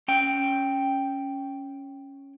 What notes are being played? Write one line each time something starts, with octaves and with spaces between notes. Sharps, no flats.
C#4 G5